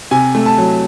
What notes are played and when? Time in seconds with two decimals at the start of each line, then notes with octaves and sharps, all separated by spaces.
0.11 C3 G#5
0.35 A3
0.46 A5
0.58 F#3